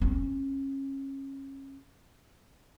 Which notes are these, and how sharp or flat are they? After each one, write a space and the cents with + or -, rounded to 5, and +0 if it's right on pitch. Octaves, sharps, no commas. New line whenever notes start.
C#4 -30